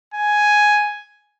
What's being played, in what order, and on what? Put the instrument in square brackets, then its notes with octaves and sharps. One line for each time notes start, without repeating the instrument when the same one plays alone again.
[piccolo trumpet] G#5